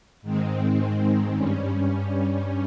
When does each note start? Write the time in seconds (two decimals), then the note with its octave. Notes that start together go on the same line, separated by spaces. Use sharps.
0.22 G#2 D#3 G#3 C4
1.32 G2 G3 C#4